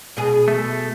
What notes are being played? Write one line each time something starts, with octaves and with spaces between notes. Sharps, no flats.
B2 G#4
A3